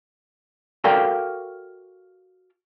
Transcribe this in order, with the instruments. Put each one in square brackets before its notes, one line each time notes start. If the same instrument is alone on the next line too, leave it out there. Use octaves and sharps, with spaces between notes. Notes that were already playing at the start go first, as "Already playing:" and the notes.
[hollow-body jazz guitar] F#4 A4 A#4 D5 F5 G5